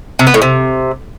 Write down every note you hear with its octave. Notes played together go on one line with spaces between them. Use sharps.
C3
B3
A2
C3